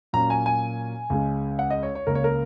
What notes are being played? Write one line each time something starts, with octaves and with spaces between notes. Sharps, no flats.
A#2 F#3 C#4 A#5
G#5
G#5
C#2 C#3 G#3
F#5
D#5
C#5
C#5
C#2 C#3 A#3 A#4
C#5
A#4